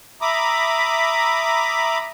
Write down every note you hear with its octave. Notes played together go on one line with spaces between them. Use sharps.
E5 A#5 B5 D6 D#6